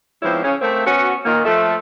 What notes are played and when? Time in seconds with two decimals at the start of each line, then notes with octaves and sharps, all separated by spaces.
0.23 G#2 F3 B3 C4 E4 C#5
0.43 C#3 C#4
0.61 A3 A#3 C4
0.87 B3 C#4 F#4
1.25 A#2 D#3 A#3
1.45 F3 A3 E5